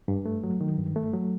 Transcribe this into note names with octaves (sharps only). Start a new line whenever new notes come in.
G2
A3
F#3
D#3
G2
A3
F#3